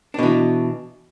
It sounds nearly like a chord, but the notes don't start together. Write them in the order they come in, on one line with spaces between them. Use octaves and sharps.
D4 B2 E3